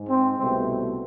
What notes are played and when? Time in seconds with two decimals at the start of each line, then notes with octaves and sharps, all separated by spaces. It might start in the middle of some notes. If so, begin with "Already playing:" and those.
Already playing: G#2 G#3
0.10 C4
0.38 C2 B2 A3 C4